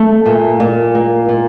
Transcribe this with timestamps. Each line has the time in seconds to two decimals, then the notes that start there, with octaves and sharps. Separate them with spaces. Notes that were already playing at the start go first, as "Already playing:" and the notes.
Already playing: A3
0.26 A#2
0.60 A#2
0.95 A#3
1.29 A#2